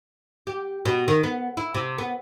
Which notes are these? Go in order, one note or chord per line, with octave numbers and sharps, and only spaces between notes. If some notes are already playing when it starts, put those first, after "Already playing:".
G4
B2
D#3
B3
E4
C3
B3